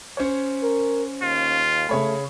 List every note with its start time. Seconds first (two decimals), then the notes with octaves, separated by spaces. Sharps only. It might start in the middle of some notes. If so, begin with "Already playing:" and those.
0.17 C#4 C5 C#5
0.63 A#4
1.22 D#2 F4
1.89 C#3 A3 C#5 B5